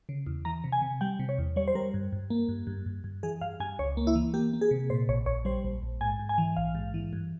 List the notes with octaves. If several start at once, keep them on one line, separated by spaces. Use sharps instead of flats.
C#3
E2
E3 A#5
C3
G#5
C3
G3 G5
C3
C#5
E2
G3 C#5
C5
G3 A#4
G2
G2
A#3
G2
G2
G2
G2
E3 G#4
G2 F5
G2 G#5
C#2 C#5
A#3
E4
E3
A#3 G4
A#3
G#4
C3
A#2 C5
A#1 C#5
A#1 C#5
G3 C5
A#1
A#1
G#2 G#5
G#2
G#5
E3
A#1 F5
G#2
E3
G2